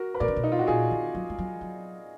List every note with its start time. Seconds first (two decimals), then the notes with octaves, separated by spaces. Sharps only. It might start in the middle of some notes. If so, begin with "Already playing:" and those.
Already playing: F#4 A#4
0.14 B4
0.20 B2 A#4 D5
0.28 D3
0.36 B2
0.44 D#4
0.52 F4
0.59 F#4
0.67 A#2 F4 G#4
0.91 D#3
1.15 F#3
1.30 G#3
1.39 F#3
1.61 F#3